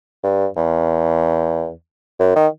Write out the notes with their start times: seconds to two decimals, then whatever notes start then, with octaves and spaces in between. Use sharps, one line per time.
0.24 G2
0.56 E2
2.20 F#2
2.36 D#3